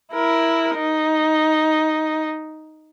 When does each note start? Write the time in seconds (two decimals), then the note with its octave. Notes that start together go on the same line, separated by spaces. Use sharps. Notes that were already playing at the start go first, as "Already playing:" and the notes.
0.13 E4 A#4
0.76 D#4